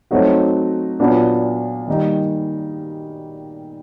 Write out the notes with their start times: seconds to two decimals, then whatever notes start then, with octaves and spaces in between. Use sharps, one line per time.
0.11 F#3 A3 C4 D#4 F#4
1.00 A#2 F#3 B3 D4
1.88 D#3 G3 A#3 D#4